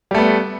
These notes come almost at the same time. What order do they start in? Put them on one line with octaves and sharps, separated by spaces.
G3 A3 B3